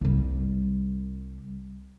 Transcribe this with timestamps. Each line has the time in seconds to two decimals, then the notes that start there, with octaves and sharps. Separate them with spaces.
0.01 C2 G3